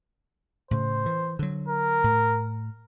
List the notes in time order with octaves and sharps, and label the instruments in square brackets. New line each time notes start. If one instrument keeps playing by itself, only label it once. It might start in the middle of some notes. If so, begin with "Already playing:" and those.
[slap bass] A2 C#3 [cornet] C5
[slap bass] E3
D3 F#3
[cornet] A#4
[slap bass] A2